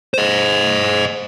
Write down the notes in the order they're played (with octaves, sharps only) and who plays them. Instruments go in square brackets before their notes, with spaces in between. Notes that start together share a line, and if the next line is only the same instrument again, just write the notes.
[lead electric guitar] C5 D#5